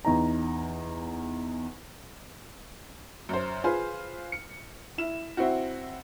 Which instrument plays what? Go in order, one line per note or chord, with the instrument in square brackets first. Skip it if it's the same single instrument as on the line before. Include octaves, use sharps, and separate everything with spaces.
[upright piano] E2 D#4 A#5
[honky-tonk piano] F#2 C5
F4 G#4 B4 C5
C#7
E4 E7
C4 E4 F#4